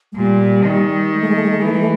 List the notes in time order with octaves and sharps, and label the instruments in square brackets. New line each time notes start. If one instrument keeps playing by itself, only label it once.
[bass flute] G#3
[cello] A#2 [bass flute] G3
[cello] D#3
[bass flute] G#3
A3
G#3
A3
G#3
A3
G#3
[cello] E3 [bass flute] A3
[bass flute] G#3
A3